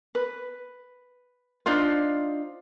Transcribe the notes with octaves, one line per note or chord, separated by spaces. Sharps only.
B4
D4 D#4 F4 C5